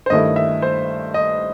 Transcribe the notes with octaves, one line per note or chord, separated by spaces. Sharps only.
C5
G2 D#3 A3 E4 D#5
E5
C5
D#5